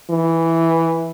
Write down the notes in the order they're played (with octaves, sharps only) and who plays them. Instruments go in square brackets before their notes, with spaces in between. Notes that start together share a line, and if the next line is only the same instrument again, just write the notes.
[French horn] E3